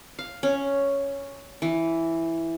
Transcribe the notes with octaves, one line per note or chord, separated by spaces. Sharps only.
F5
C#4
E3